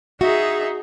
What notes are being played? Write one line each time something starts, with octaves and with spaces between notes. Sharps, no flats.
D#4 F#4 G#4 E5